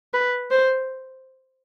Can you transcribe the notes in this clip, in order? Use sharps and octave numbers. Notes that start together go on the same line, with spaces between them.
B4
C5